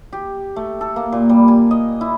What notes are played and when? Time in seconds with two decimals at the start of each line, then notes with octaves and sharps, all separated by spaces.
0.13 G4
0.56 A3
0.81 A4
0.96 A#3
1.12 A#2
1.29 G3
1.48 G#5
1.71 D#5
2.01 E4